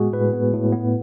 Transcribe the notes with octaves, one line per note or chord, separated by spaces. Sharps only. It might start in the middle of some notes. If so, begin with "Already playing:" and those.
Already playing: A2 G#3 B3 F#4 G#4
A2 B4
B3
A2
B3